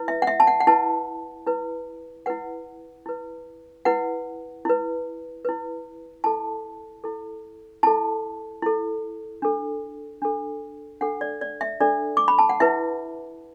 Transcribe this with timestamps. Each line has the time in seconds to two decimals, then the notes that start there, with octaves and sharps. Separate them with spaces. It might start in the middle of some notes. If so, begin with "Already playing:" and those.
Already playing: E4 B4
0.08 E5
0.22 F#5
0.27 E5
0.40 A5
0.47 F#5
0.60 F#5
0.67 E4 B4 A5
1.47 E4 B4
2.26 E4 B4 F#5
3.06 E4 B4
3.85 E4 B4 F#5
4.65 E4 B4
5.45 E4 B4
6.24 E4 A4 A5
7.04 E4 A4
7.83 E4 A4 A5
8.62 E4 A4
9.42 D4 A4
10.22 D4 A4
11.01 D4 A4 F#5
11.21 D5
11.41 D5
11.61 E5
11.80 D4 A4 D5
12.17 D6
12.28 B5
12.39 A5
12.49 F#5
12.60 E4 B4 E5